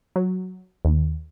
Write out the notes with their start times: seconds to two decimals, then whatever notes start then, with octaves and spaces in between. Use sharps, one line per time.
0.16 F#3
0.85 D#2